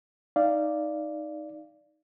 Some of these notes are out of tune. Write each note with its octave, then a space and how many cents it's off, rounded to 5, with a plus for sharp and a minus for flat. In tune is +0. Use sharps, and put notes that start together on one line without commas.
D#4 +0 D5 +0 F5 -15